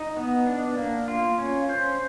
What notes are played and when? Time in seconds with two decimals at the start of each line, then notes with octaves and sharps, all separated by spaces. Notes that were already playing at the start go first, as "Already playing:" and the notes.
Already playing: D#4
0.17 B3
0.47 D4
0.77 A#3
1.08 F4
1.38 C#4
1.69 C5